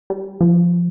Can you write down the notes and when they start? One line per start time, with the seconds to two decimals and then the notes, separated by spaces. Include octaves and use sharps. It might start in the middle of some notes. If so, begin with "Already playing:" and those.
0.10 G3
0.41 F3